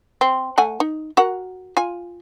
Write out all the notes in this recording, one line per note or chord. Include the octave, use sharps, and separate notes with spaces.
C4
A3 F#5 G#5
D#4
F#4 A#4 F#5
F4 G#5